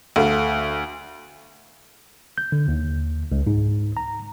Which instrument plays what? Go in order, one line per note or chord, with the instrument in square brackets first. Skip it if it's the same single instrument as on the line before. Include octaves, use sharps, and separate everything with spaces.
[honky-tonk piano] D2 [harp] A4 F5
[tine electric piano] G6
D3
D#2
C#2
G#2
A#5